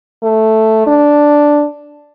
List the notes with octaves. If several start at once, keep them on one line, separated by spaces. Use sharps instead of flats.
A3
D4